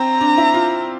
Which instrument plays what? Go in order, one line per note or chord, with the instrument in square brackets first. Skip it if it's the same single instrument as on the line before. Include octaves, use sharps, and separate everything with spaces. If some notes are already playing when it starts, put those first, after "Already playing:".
Already playing: [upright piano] C4 [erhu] A#5
[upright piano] D4
E4
F4